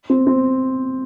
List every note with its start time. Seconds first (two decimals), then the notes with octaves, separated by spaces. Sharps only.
0.10 C4
0.27 C4